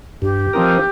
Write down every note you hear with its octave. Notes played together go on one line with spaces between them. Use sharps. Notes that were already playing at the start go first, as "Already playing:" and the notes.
G2 G4
F3 C4 D#4 A#4